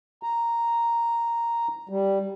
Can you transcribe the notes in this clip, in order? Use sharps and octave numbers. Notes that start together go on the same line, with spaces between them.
A#5
G3